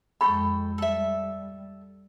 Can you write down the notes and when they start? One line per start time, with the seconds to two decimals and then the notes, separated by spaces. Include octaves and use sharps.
0.21 F2 G#3 A4 G5 B5 C#6
0.78 G3 A4 E5